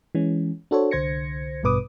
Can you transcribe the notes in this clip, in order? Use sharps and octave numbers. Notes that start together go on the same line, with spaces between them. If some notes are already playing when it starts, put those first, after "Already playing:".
E3 G#3 C#4
D4 F#4 A4 C5 C#5
C2 D3 C5 G#6 A#6 C#7
A1 G2 B2 B4 D6 D#6